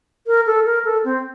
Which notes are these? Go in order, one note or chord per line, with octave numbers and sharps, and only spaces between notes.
A#4
A4
A#4
A4
C4